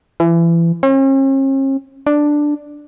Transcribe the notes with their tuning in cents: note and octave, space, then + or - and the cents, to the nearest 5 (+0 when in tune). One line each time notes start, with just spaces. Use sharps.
E3 +30
C#4 -45
D4 +5